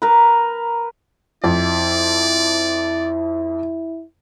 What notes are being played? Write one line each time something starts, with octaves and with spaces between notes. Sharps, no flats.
A#4 B4
F2 E4 D5